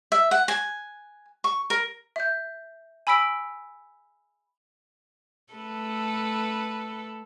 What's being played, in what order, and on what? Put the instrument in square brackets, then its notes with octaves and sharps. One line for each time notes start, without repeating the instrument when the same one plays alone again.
[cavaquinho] E5
F#5
G#5
C#6
A#4
[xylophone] E5 G6
G#5 B5 E6 B6 D7
[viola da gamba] A3 A4 B4